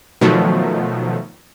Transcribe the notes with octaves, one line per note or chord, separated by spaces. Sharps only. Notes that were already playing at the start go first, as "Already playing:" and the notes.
B2 D#3 F3 F#3 A3